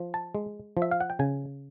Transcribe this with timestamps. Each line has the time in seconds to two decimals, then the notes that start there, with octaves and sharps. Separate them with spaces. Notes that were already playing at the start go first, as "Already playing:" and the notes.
Already playing: F3
0.14 A5
0.35 G#3
0.77 F3
0.82 E5
0.91 F5
1.01 F#5
1.10 G5
1.19 C#3 G#5